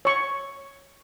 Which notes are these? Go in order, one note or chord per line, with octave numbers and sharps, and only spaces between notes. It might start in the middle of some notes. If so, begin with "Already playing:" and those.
C#5 C#6